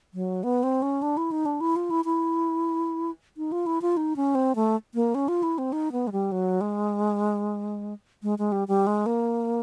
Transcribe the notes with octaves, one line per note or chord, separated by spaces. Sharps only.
F#3
B3
C4
C#4
D4
E4
D#4
D4
E4
F4
E4
E4
D#4
F4
E4
F4
D#4
C#4
C4
A3
A#3
C#4
F4
E4
C4
D#4
B3
G#3
G3
F#3
G#3
G#3
G#3
G3
G3
G#3
A#3